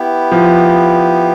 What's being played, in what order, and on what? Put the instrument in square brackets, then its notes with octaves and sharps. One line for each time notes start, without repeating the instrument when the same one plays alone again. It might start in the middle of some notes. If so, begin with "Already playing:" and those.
Already playing: [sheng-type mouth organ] B3 E4 G4
[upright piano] F3